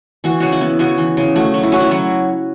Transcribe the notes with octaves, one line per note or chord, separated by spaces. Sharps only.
E3 F#4
C#3 F#4
E4
B3
C#3 F#4
E3
C#3
A3 F#4
F#3
E4
C#4 F#4
E4
F#3 F#4